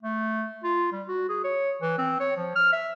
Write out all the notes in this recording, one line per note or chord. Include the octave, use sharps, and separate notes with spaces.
A3
F4
G3
F#4
G#4
C#5
E3
C4
C#5
F3
F6
E5